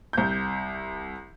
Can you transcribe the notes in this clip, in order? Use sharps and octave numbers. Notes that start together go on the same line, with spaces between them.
C2 G6